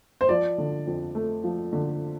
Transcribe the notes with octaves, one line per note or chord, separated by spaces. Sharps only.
C5
F3 D5
D3
F2
A3
F3
D3